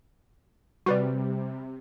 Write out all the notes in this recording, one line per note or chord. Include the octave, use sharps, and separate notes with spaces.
C3 G3 F#4 B4 D5